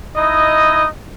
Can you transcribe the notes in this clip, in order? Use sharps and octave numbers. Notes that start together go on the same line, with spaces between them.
D#4 E4 D#5